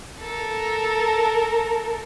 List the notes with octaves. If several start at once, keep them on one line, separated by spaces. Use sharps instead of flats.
A4 A#4